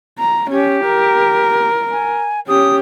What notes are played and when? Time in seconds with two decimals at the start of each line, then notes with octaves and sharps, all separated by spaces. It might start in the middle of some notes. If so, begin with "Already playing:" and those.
0.19 A#5
0.51 C#4 G4
0.86 A#4
1.91 G#5
2.48 C#4 G4 D#6